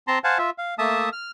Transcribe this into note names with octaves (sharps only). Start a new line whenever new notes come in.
C4 A5 A#5 C6
C5 F5 F#5 G#5 A5
F4 E5
F5
A3 A#3 E5 A5 D#6
F6